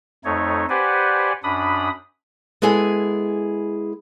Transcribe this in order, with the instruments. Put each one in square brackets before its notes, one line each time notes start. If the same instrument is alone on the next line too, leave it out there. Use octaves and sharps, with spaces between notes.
[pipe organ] F2 A3 D#4 C#5
G4 B4 C5 D5 F#5 G#5
F#2 D4 B5 D#6
[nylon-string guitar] G#3 B3 E4 G#4 A4 G#5